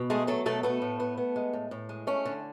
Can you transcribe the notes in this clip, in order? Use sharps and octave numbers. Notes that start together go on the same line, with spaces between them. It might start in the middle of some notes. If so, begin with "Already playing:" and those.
Already playing: B2
G#3 A3 G#4
F#3 A3 A4
B2 A3 A4
A3 B3 A4
A2
B3
B3
G#3
A2
A2
G#3
A3 C#4
D3